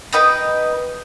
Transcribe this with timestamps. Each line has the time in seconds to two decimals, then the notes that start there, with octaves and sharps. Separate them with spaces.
0.13 D#4 B4 D#5 G5